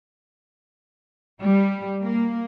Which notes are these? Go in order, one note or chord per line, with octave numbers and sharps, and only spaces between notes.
G3
A#3